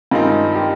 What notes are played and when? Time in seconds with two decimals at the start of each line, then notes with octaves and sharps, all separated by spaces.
0.11 G2 D#3 G#3 C4 D#4 F4
0.55 G4